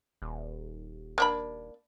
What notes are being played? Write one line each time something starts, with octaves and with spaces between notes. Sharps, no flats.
D#1
A#3 D4 B5